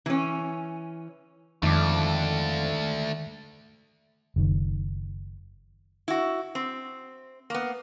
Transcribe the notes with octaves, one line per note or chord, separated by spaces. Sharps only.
E3 C#4
F2 D#3 G#3 A3 D4 D6
F#1 D#3
E4 F#4
C4
A#3 B3